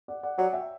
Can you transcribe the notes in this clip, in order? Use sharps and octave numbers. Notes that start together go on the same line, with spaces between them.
D5 F#5
D5 F#5
F#3 D5 F#5
E5 G5